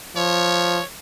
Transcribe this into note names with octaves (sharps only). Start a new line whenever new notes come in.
F3 C#5